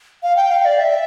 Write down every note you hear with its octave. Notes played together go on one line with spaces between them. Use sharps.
F5
G5
F5
D5
E5